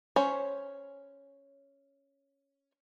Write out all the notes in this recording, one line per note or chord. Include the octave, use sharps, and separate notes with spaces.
C#4 C5 C#5 B5